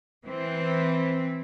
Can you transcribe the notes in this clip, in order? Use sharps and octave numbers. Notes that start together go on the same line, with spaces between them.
E3 C4